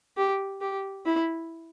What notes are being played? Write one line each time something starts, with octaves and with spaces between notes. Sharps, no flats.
G4
G4
E4